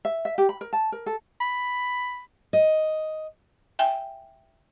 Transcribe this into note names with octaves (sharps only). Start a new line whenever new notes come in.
E5
E5
G4
B5
A#4
A5
A#4
A4
B5
D#5
E5 G5 G#5